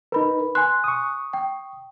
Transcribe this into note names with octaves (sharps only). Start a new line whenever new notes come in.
D#4 A#4 B4 B5
G#5 C6 F#6
C#6 D#6
G5